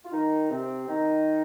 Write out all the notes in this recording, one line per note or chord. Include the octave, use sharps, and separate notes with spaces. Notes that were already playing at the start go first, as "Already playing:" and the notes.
F4
D#3 D#4
C3 C4
D#3 D#4